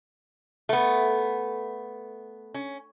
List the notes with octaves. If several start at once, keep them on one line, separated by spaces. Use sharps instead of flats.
A3 B3
C#4